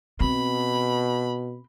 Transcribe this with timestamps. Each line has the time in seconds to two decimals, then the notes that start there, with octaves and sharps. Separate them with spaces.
0.21 B2 C4 B5